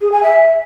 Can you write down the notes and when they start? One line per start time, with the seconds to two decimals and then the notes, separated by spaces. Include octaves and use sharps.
0.01 G#4
0.12 G#5
0.23 E5